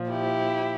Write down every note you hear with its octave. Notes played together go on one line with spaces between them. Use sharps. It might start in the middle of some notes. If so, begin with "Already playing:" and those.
Already playing: A#2 F3
E4 G4